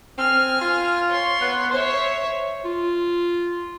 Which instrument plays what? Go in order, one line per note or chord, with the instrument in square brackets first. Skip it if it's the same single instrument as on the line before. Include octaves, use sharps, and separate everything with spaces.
[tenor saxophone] C4 [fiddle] G#5 F6
[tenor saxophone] F4
[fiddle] C#5 C6
[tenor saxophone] B3
[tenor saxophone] C5 [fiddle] C#5 E5
[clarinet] F4